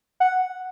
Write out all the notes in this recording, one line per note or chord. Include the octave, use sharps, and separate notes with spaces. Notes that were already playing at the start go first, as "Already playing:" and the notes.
F#5